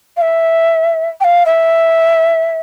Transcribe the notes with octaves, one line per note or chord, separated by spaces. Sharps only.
F5
E5
G5
F5
E5